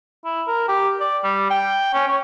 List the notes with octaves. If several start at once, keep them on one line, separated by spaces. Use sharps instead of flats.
E4
A#4
G4
D5
G3
G5
C#4
C#5